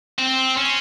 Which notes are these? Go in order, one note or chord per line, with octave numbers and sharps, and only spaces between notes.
C4
C#4